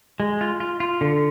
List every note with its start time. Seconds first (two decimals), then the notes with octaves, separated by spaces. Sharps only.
0.20 G#3
0.41 F4
0.60 F4
0.80 F4
1.01 D3